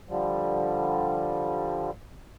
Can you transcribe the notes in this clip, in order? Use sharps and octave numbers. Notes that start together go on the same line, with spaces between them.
D3 F3 G3